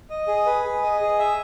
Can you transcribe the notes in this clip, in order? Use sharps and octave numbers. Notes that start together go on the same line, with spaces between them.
D#5
G#4
B4
G#4
D#5
G#4
E5